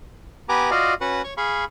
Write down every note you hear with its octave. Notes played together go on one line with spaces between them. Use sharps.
B3 G4 B4 G#5 A#5 D6
F4 F#4 D5 D#5 F5
C#4 F#4 B4 F#5
C#5 C#6
G#4 F5 B5 C#6